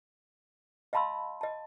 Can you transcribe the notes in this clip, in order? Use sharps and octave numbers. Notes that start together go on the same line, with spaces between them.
D#5 F5 A5 B5 C6 E6
D#5 A5